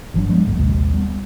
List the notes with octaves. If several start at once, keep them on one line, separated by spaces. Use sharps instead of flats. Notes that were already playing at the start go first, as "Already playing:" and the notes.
G1 E3 F#3 D4
F3 G3 G#3 B3
G1 D2 A2
A#1 D#2 C3 G#3
G3 B3